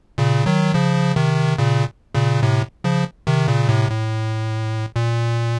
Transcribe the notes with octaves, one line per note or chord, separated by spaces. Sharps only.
A#2 C#3
D#3 F#3
C#3 F3
C3 D#3
A#2 C#3
A#2 C#3
A2 C3
C#3 F3
C3 D#3
A#2 C#3
A2 C3
A2
A#2